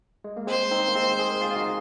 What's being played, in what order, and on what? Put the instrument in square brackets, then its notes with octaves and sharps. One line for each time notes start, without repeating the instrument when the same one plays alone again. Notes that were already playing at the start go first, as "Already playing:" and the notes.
[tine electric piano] G#3
A#3
[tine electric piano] G#3 C4 [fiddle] C5
[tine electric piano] C4 D#4
A#3
G#3 C4
G#4
A#4
F4 G#4
F4
D#4 F#4